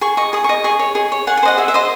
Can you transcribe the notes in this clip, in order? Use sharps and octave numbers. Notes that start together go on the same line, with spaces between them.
G#4 C#6
D#5 C#6
G#4 D#6
C#6
D#5
G#4 C#6
C#5
G#4
C#5
G#4 F#5
G#5
C5 D#5 F#5
G#4 E5
E5
C5 D#5